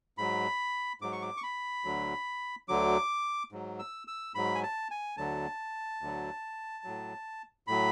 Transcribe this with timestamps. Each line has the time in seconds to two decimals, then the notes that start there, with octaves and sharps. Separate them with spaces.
0.18 G#2 F#3 B5
1.01 G#2 F#3 D6
1.12 C#6
1.22 D6
1.37 C#6
1.43 B5
1.85 D2 D3 F#3
2.68 D2 D3 F#3 D6
3.52 G#2 F#3
3.79 E6
4.07 E6
4.35 G#2 F#3 B5
4.55 G#5
4.63 A5
4.91 G#5
5.17 D2 D3 F#3 A5
6.01 D2 D3 F#3
6.84 A2 F#3
7.67 A2 F#3 B5